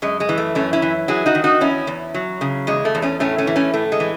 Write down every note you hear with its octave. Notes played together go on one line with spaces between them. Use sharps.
F#2 G#3
G#3
E3
A3
F#2 A3 C#4
C#4 E4
E3
F#3 E4 G#4
D#4 F#4
D#3
D#4 F#4
E2 C#4 E4
E2
F#3
C#3
E2 G#3
A3
E2
A3 C#4
A2 A3 C#4
A3 C#4
E3
A3 C#4
A2 A3
G#3
E3